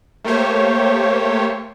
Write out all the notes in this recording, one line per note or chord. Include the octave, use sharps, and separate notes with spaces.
A3 A#3 G4 C5 C#5